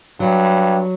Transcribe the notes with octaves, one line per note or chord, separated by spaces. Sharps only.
G2 F#3